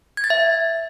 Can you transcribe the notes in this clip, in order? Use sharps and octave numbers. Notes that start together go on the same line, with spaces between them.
G#6
A6
E5